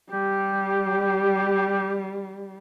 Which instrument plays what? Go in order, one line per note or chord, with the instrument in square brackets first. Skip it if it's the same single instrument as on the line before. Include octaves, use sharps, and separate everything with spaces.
[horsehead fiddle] G3 [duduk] G4